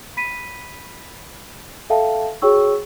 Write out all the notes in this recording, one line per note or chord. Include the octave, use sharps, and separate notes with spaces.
B5 B6 D#7
A4 E5 F5 G5 A5
F#4 G#4 C#5 G5 C#6 E6